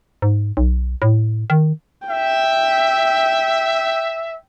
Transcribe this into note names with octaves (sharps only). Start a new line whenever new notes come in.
G#2
B1
A2
D#3
E5 G5